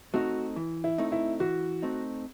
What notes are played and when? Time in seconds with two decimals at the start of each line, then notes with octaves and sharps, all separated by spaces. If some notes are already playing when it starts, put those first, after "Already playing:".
0.14 A3 C4 D#4 F#4
0.56 E3
0.84 E4
0.98 A3 C4 D#4
1.12 E4
1.40 E3 F#4
1.82 A3 C4 D#4